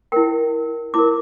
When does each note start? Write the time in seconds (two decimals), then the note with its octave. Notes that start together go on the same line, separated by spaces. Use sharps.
0.12 E4 A#4 G5
0.94 E4 A#4 D6